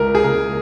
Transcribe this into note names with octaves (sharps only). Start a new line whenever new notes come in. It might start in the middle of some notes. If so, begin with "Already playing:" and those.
Already playing: C#2 A#4
G#4
C#3 A#3 A#4